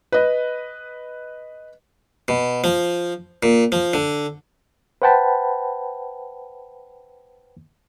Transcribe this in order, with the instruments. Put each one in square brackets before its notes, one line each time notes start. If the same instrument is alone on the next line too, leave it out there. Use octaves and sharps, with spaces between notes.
[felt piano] B4 D#5
[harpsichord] B2
F3
A#2
F3
D3
[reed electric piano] B4 C5 F#5 G5 A5 B5